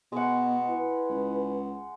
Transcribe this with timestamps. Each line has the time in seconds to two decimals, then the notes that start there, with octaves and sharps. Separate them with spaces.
0.12 B2 G#3 B3 F#5
0.68 E4 B4
1.10 C#2